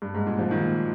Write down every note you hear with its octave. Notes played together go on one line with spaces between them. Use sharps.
G2
G#2
A#2
F3
D#3